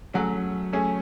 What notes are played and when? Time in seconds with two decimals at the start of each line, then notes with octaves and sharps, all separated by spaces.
0.14 F#3 A3 C#4 G#4
0.73 A3 C#4 G#4